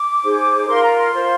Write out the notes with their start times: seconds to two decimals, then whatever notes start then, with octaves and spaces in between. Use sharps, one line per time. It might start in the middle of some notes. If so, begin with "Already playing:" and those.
Already playing: D6
0.24 D#4 G#4 C5
0.67 F4 A#4 C6
0.82 A#5
0.96 C6
1.10 F4 C5